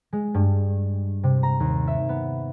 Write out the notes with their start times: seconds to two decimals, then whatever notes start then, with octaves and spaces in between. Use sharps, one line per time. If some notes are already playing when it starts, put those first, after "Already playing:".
0.13 G#3
0.34 G2
1.23 C3
1.43 A#5
1.60 D#2
1.87 E5
2.09 B3